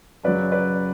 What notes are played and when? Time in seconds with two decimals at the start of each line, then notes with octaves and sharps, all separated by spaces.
0.24 F#2 C#3 F#3 B4 D5
0.52 B4 D5